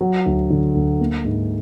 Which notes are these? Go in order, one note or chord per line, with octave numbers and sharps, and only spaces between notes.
F#3
D2
D3
D2
A#3
G#2